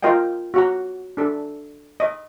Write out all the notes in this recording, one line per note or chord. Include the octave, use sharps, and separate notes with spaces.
F4 A#4 D#5 F5 G5
F#4 F#5 A#5
D4 A4
D#5